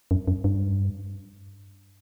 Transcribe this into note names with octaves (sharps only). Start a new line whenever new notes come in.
F#2
F#2
G2